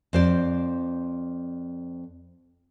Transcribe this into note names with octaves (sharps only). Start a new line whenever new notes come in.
F2 C5 D5